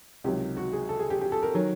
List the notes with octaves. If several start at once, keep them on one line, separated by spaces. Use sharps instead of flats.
C#2 C3 D#3 F#3 G4
F#4
G#4
A4
G#4
G4
G4
A4
A#4
D#3 F#3